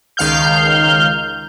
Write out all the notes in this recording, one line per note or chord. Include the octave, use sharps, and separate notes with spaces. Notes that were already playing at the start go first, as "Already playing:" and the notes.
C#2 D#3 F5 F6 G6